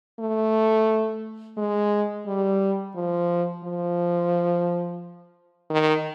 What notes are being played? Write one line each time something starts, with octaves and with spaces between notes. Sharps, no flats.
A3
G#3
G3
F3
F3
D#3